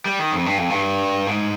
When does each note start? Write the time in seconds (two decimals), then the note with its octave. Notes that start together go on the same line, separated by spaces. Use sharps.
0.06 G3
0.19 D#3
0.32 F2
0.46 G2
0.58 F2
0.70 G2
1.27 G#2